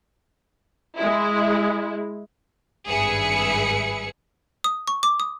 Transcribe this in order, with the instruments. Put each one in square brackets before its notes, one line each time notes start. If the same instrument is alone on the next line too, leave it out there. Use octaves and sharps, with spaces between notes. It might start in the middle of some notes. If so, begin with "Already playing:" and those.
[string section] G#3 E4
G#1 G2 G#4 B4 E5 C#7
[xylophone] D#6
C#6
D6
D#6